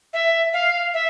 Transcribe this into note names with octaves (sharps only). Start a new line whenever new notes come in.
E5
F5
E5